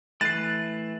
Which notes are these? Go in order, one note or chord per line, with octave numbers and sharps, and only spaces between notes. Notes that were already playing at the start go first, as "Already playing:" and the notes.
E3 A3 B4 A6 C7